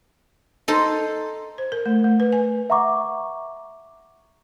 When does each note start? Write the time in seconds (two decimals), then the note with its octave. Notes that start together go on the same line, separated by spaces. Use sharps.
0.68 D#4 A4 C5
1.58 C5
1.72 A#4
1.86 A3
2.04 A3
2.20 B4
2.32 G#5
2.70 E5 F#5 A#5 C#6 D6